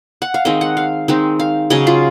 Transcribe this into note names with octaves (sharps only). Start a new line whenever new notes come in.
F#5
F5
D#3 G#3 C4 D#5
F#5
F5
D#3 G#3 C4 D#4
F5
C#3 F#3 C#4 D#5
F4